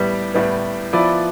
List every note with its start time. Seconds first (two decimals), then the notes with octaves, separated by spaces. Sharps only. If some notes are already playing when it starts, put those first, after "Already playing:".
Already playing: A2 G3 B3
0.34 A2 G3 B3
0.93 F3 B3 E4 B4 D5